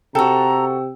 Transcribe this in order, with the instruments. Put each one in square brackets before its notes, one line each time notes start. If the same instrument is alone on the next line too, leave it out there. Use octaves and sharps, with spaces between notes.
[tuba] C3 [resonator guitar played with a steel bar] F#4 A4 [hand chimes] G5 E6 [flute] A#5